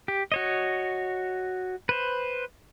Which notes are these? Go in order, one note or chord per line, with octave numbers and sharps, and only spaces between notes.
G4
F#4 C#5 D#5
B4 C5